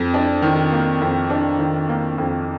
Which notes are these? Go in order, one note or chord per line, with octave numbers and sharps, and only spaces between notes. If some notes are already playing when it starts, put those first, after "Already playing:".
Already playing: F2
D4
D#3
A#3
F2
D4
D#3
A#3
F2